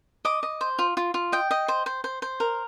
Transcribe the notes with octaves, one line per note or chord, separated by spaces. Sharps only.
D#5 D6
D#5
C5
F4
F4
F4
D#5 G5
D#5
C5
C5
C5
C5
A#4